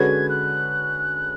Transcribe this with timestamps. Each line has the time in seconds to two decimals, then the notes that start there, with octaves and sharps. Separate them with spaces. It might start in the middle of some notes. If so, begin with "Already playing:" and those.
Already playing: D3 G#3 C#4 F#4 B4 G#6
0.29 F#6